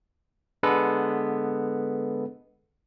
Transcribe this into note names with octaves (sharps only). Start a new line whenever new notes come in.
D3 G#3 B3 A4 B4